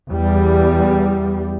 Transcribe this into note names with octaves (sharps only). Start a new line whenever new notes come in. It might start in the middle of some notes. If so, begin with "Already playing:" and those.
E2 G3